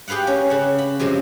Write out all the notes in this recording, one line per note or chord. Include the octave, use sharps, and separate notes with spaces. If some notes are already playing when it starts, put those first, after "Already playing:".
G4 G#4 B4 F5 F#5
C#4
C#3 F#5
B5
F#2 C3 F3 G#3